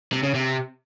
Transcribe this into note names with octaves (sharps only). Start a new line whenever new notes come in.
C3
C#3
C3